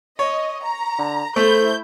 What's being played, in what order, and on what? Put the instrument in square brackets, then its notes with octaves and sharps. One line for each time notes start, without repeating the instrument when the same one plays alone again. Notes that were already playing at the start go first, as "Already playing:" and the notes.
[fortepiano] C#5 [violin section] D#5
[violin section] A#5
[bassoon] D3
[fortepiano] A3 [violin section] E4 G6 [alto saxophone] A4 [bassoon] C5